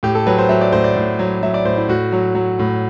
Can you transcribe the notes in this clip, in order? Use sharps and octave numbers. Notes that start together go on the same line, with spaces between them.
A2 G4
A4
F#3 B4
C5
F#3 E5
D5
A2 C5
D5
A2
F#3
F#3 E5
D5
A2 C5
E4
A2 F#4
F#3
F#3
A2